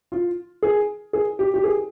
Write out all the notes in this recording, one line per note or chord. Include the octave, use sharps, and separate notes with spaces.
F4
G#4
G#4
G4
G4
G#4